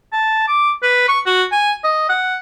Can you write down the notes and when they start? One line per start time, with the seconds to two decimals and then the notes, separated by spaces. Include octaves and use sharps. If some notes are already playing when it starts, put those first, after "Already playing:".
0.13 A5
0.48 D6
0.82 B4
1.08 C#6
1.26 F#4
1.52 G#5
1.84 D#5
2.09 F#5